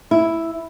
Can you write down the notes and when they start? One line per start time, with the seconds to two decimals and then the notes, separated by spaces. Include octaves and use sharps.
0.11 E4